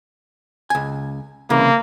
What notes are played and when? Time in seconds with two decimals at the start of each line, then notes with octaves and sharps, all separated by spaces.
0.70 C#2 G#5
1.50 C2 C#3 E3 A#3